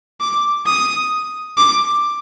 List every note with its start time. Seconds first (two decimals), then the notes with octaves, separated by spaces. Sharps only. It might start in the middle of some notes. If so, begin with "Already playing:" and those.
0.20 D6
0.66 D#6
1.57 D6